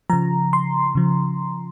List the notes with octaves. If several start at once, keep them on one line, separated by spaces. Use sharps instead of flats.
C#3 F3 A#5
C6
C#3 F3